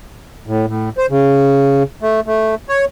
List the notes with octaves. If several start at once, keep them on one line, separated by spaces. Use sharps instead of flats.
A2
A2
C5
C#3
A3
A3
C#5